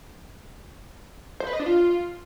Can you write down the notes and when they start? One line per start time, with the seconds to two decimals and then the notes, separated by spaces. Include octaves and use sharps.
1.40 C5
1.47 B4
1.53 D#5
1.60 D4
1.66 F4